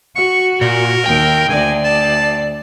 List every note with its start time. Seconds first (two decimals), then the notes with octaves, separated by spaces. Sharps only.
0.16 F#4 C#6
0.61 A#2 A#4
1.06 D#2 G5
1.49 D2 D5 G#5
1.84 A5